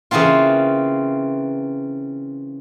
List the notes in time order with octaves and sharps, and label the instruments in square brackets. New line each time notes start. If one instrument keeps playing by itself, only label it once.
[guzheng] C#3 E3 A#3 C4 F4